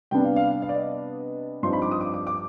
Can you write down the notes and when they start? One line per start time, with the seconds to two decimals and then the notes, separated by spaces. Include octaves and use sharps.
0.11 C3 G3 B3 D4 G5
0.24 F5
0.36 F5
0.62 F5
0.69 D5
0.74 D#5
1.63 G2 F3 C4 D#4 C6
1.73 B5
1.82 D6
1.91 D#6
2.01 D6
2.14 D6
2.27 D6